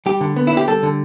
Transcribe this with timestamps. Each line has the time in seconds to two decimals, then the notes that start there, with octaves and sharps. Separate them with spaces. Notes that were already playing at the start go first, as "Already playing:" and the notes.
0.06 G3 G4
0.21 D3
0.36 B3
0.47 D3 E4
0.57 G4
0.68 G3 A4
0.83 D3